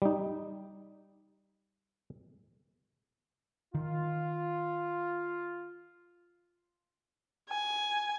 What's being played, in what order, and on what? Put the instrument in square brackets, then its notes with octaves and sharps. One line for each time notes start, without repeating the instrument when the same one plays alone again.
[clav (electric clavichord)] G3 D#4
[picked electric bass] D#3 [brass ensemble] F4
[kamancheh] G#5